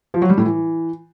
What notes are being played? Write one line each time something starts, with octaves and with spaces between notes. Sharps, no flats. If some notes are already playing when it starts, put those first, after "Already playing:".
F3
F#3
G3
A2
E3